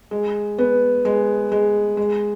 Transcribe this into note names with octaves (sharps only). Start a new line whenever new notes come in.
G#3
B3
G#3
G#3
G#3